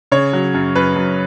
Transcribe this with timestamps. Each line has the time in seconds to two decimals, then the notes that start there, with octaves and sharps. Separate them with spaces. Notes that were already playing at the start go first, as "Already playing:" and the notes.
0.12 C#3 C#5
0.33 F#3
0.54 F#2
0.76 F#2 B4
0.96 F#2